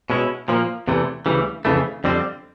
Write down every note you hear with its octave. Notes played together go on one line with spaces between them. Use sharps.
B2 G#3 C#4 E4
A#2 F3 A#3
E2 C3 E3 A3
D2 C#3 E3 G3
F2 C#3 E3 A3
F2 D3 G3 C4